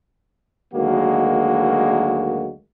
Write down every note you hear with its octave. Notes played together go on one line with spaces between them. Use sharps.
D2 D#3 F#3 G#3 A#3 F#4